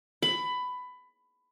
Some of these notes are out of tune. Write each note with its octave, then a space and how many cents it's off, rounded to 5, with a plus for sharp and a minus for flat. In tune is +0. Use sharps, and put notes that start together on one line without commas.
B5 +15